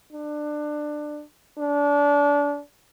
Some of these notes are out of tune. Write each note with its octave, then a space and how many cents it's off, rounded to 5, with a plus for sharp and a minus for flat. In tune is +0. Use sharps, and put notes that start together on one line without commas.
D4 +20
D4 -25